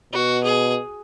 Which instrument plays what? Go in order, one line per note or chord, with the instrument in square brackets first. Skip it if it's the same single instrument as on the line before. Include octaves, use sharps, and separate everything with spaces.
[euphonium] B2 [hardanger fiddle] F#4
[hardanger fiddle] G#4